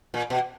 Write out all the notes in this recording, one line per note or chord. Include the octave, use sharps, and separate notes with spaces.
A#2
B2